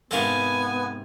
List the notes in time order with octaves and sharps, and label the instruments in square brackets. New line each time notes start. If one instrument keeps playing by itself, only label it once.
[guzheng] G#2 C3 C4 [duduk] B3 [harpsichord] A4 A#4 F5 [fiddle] G#5